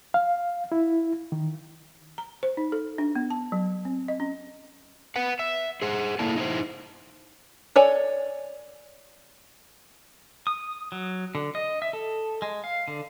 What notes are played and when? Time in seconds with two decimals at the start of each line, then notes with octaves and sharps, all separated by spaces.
0.14 F5
0.72 E4
1.32 D#3
2.18 A#5
2.43 C5
2.57 D#4
2.72 A4
2.98 D4
3.15 B3
3.30 A5
3.52 F#3
3.85 C4
4.08 D#5
4.20 C#4
5.16 B4 F#5
5.39 E5
5.82 G#4 C5 F#5
6.19 A#3 E4 A4 D5 A5
6.36 D#4 E4 A4 C5
7.76 A4 C#5 D5 G#5
10.47 D#6
10.92 F#3
11.35 D3
11.55 D#5
11.82 E5
11.93 A4
12.42 G#3
12.64 F5
12.88 D3